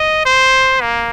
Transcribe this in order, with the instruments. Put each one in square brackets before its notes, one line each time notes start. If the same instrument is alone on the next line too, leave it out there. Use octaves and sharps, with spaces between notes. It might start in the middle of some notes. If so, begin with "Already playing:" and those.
Already playing: [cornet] D#5
C5
A#3